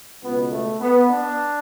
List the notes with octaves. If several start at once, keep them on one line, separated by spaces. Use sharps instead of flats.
C#2 B2 B3
A3
B3
D4